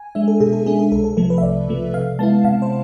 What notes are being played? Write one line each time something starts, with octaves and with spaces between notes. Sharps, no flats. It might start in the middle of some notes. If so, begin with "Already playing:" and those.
Already playing: G#5
G#3 D4 E5
A4
B2 G#4
A4
G#3 D4 G#4
G#4
C2 A4
A4
C3 F3 A3 A4
B4
E5
C2 D5
C3 F3 A3
C3 F5
G#3 B3 E4 A5
C3 F5
C5